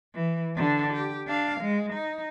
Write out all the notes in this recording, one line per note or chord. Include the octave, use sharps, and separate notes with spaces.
E3
D3 D4
G4
D4 F5
G#3
D#4